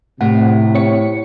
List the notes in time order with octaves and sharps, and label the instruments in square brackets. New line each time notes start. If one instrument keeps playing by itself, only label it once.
[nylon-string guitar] A2 [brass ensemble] C3 [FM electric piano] F#5
[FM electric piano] C4 C#5 C#7